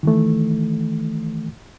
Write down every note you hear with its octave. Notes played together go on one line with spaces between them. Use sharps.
D#3 E3 A3